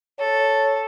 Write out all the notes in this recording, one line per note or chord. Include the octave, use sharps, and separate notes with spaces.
A4 C#5